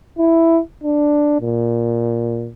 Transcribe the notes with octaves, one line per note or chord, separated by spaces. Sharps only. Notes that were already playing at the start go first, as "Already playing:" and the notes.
E4
D4
A#2